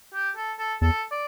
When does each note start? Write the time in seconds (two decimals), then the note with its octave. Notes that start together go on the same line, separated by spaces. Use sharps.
0.15 G4
0.37 A4
0.59 A4
0.81 E2 A4
1.11 D5